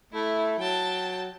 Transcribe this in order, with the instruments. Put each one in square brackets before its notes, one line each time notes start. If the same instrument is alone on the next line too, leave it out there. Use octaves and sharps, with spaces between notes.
[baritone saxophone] A3 [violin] E4
[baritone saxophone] F#3 [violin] G5 A5